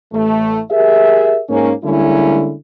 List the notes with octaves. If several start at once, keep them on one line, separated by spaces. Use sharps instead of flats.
A1 A3
G4 G#4 A#4 E5
G#2 A#3 C#4
D3 G3 G#3 A#3 C#4 E4